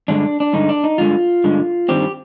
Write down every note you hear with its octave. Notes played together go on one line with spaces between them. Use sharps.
G2 D3 G#3 D4
D4
G2 D3 G#3 D#4
D4
D#4
G2 D3 G#3 F4
G2 D3 G#3
G2 D#3 G3 C4 G4